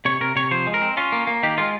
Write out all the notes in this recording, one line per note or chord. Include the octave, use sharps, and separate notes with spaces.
C3 C#5
C3 A#4
C3 C#5
F3 C5
G#3
A#4
C4
C#4 F4
A#3
A#3
D#3 G4
G#3 F4